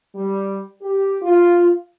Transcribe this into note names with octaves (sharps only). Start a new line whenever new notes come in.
G3
G4
F4